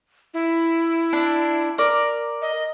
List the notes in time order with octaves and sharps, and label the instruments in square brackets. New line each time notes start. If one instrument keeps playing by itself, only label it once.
[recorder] E4
[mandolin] D4
A#4 D5
[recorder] D#5